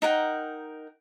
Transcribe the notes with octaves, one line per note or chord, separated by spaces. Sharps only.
D#4 A#4 F#5 G5